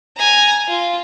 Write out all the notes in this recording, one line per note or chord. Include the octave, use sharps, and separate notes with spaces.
G#5 A#5
F4